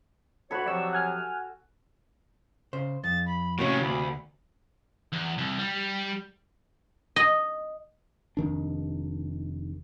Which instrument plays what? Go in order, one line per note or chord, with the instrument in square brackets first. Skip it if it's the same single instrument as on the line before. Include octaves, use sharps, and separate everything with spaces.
[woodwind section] D2 C#5 B5 [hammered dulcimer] F#4 A4
[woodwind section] C3 F3 F#3 [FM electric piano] D5 C#6 E6
[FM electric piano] F#5 G#5 F6
[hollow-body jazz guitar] C#3 C5
[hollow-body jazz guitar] F2 [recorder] A6
[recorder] B5
[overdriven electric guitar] A2 C#4 [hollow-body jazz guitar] C3 A#3 F#4 [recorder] C#6
[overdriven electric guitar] D2 [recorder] B5
[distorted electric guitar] E2
C2
G3
[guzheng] D#5
[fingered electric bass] F1 D#3 D4